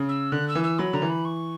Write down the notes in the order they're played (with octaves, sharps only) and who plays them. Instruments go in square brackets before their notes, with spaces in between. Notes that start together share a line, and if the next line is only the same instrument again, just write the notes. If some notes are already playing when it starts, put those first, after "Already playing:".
Already playing: [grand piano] C#3
[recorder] E6
[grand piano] D3 [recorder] F#6
[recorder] E6
[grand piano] E3
[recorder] E6
[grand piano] F#3 [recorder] B5
[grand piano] D3 [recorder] A#5
[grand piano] E3
[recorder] B5
C#6